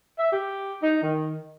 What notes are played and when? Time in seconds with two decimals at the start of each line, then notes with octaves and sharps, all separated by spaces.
0.19 E5
0.32 G4
0.81 D#4
1.02 D#3